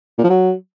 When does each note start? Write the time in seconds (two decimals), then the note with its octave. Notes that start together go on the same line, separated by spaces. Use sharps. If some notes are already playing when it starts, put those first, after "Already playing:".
0.18 A#2
0.24 F3
0.29 F#3